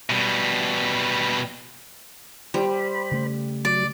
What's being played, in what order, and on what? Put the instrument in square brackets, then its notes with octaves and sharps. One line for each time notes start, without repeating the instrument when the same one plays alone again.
[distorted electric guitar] B2 G3
[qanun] G3 [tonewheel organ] C5 B5
[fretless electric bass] C#3 A3
[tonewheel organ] F#3 [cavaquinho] D5